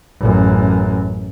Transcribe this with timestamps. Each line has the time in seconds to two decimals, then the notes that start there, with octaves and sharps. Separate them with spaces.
0.20 A1 F#2